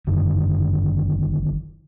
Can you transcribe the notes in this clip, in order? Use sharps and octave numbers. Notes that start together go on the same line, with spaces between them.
F#1 F#2 D3 D#3